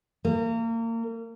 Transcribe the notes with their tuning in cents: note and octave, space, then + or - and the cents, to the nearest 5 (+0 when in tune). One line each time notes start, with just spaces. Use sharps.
A#3 -30